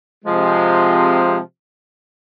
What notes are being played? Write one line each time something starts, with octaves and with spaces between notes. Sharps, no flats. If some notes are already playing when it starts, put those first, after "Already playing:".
C3 F3 G#3